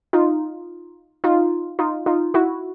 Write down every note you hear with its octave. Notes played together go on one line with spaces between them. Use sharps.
D#4 F4
D#4 F4
D#4 F4
D#4 F4
E4 F#4